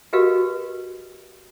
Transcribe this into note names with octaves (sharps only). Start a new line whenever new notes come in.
F#4 G4 A#4 B4 D#5 F5